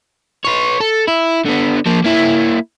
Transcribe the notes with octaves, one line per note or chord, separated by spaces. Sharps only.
B4 C#5
A4
E4
D3 B3
F3 A#3
A#3 E4